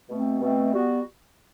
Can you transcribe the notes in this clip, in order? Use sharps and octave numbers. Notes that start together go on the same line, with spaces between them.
B2 A3 C4
B2 A3 C4
G3 B3 F#4